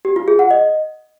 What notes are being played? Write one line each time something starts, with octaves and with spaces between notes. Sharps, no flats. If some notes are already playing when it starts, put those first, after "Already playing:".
G4
F4
G#4
F#5
D#5